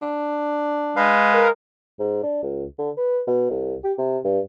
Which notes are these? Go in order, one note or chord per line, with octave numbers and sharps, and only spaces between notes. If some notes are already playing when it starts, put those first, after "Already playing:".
D4
G#3 B4 F5
A#4
G#2
D4
C#2
D3
B4
B2
C2
G4
C3
G2